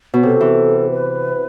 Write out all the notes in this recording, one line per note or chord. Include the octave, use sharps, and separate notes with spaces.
B2
C3 A4
E3
B4